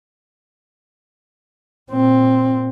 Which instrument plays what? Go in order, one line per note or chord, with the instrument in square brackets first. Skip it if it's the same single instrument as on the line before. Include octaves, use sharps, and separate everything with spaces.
[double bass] A#2 C4